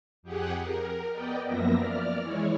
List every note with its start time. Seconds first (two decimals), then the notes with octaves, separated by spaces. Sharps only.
0.23 F2 G4 G#4 F#5
0.60 A#4
1.12 B3 D5 D#5 G5
1.45 F#2 F3 A#3 B3 E5 A#6
1.75 D5 F6
2.22 E3 G#3 E4 C#5